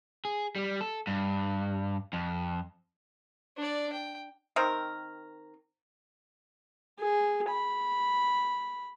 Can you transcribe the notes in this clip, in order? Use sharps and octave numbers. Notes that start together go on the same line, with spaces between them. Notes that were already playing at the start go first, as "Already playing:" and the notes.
G#4
G3
A4
G2
F2
D4 D5
G5
D#3 C4 A#4
G#4
B5